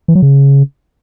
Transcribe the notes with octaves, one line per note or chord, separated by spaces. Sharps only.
E3
F#3
C#3